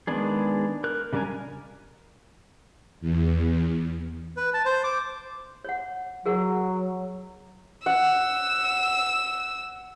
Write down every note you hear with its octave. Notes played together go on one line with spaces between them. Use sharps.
D#3 G#3 B3 D4 G#4
A#4 F#6
C#3 G3 D4 A#4 G#5
E2
B4
A5
C5
D6
C#5 F#5
F#3 G#4 A#4 F#5
F#5 E6